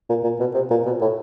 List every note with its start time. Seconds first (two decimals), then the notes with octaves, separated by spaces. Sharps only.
0.09 A#2
0.24 A#2
0.40 B2
0.54 C3
0.71 A#2
0.86 B2
1.01 A2